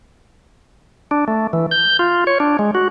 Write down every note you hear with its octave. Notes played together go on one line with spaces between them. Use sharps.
D4
A3
E3
G6
F4
C#5
D4
G#3
F#4